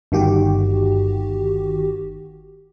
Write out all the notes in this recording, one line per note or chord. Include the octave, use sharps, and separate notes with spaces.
G1 D#3 F#4 G4